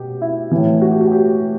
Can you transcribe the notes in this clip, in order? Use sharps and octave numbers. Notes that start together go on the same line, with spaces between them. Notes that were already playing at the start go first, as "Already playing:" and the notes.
Already playing: B2 G4
E4
A2 E3
F#4
G4
F#4
G4